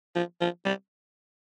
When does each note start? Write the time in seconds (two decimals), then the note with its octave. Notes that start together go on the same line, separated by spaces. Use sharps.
0.15 F3
0.41 F3
0.65 G3